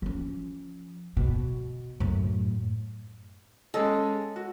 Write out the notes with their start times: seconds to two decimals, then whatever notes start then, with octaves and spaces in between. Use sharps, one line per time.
0.02 F3 C#4
1.17 B2
2.00 F#2 A2
3.74 G#3 C#4 A4 D#5
4.36 F#4